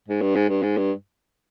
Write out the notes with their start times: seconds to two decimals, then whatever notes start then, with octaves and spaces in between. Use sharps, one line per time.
0.08 G#2
0.21 G2
0.36 G#2
0.49 G2
0.63 G#2
0.77 G2